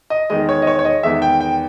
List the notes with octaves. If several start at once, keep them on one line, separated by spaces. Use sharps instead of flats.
D#5
E2 D#3 G#3 D#5
C#5
D#5
C#5
C#5
D#5
E2 D#3 G#3 E5
G5
G5